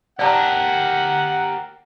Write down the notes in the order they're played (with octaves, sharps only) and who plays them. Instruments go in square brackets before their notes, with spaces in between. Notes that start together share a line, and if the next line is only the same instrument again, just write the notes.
[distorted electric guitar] G4 A#4 [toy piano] D5 A5 A#5 [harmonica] F#5